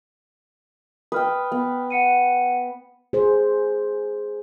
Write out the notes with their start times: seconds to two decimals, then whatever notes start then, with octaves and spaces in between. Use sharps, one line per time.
1.12 B4 G5 D#6 F6
1.52 B3
1.90 F#5 C#7 D#7
3.13 G#4 C5